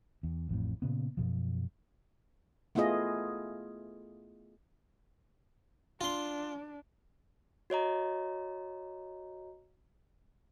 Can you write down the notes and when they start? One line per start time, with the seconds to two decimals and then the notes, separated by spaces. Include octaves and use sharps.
0.23 E2
0.49 A1 F2 A2
0.82 A#2 C#3 B3
1.17 F#2 B2 F3
2.75 A3 B3 E4 F4 G#4 D#5
6.01 D4 F4 C6
7.70 F#4 C#5 D#5 A#5